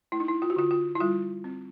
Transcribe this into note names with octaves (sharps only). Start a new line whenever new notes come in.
A3 E4
D#4
E4
F4
F#4
D3 F4
F4
E4
G3 F4
C4